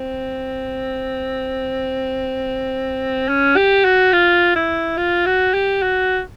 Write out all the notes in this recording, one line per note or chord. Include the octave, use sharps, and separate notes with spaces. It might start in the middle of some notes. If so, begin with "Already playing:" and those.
Already playing: C4
C#4
G4
F#4
F4
E4
F4
F#4
G4
F#4